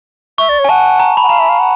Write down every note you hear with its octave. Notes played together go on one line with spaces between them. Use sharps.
E5 C#6
D5
C#5
G#5
F#5 A5
A#5
B5
F#5
F5 A#5
E5
F5
F#5